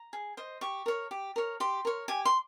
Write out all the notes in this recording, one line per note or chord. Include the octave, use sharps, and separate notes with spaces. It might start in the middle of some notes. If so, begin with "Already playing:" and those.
Already playing: A#5
G#4
C5 D#5
G4 C#6
A#4 C#5
G4
A#4 C#5
G4 C6
A#4 C#5
G4 G#5
C6